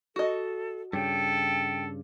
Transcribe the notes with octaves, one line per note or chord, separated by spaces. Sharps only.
F#4 A4 D#5
G2 C#3 A4 G5